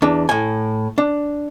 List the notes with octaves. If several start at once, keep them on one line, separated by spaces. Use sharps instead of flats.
E2 D4
A2 G#5
D4